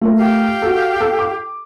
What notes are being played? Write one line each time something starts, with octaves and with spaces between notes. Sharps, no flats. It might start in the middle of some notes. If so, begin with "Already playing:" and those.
A3 F4 A#4
G4 F5 G5
F#4 A4
A4
D6